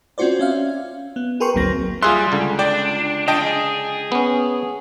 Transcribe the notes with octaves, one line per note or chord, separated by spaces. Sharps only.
C4 C#4 F4 F#4 C5 D5
C#4 E5 F5
B3
G#4 A#4 B4 G5 C6 C#6
G#1 D2 F#3 A#3 C4 A#6
G3 F4 G#4 E5 C6 F#6
C#2 D3
D4 D5 G5
D4 F4 D#5 G5 A5
G#4
B3 C#4